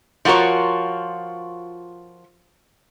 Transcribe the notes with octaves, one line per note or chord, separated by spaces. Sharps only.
F3 F4 F#4 A#4 C#5